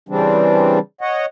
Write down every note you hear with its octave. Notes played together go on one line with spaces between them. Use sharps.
C#3 E3 G3 C4 D4
C#5 D#5 F#5